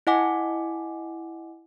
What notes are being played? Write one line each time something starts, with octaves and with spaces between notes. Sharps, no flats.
E4 D#5 F#5 G#5 D6